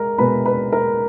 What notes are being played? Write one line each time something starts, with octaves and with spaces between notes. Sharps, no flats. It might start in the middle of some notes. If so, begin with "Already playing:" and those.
Already playing: G#3 A#4 A#5
B2 G#3 B4 B5
B4 B5
A#4 A#5